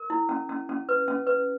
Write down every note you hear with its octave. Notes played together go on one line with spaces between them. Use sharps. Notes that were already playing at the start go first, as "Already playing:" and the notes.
Already playing: A#4
E4
C#4
C#4
C#4
B4
C#4
B4